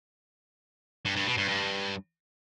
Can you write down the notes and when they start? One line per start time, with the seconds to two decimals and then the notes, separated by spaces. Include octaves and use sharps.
1.05 G2
1.16 G2
1.27 B2
1.38 G2
1.48 G2